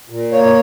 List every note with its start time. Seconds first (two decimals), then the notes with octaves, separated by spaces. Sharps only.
0.10 A#2
0.32 A#3 C#5